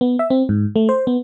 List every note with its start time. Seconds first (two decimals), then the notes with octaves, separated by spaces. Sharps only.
0.01 B3
0.19 E5
0.30 C4
0.49 G#2
0.76 A3
0.89 C5
1.07 B3